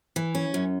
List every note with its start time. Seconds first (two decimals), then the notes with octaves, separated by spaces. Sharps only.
0.16 E3
0.35 C#4
0.54 F#2